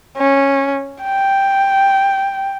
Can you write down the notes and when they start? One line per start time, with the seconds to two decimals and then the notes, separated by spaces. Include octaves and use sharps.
0.17 C#4
1.03 G5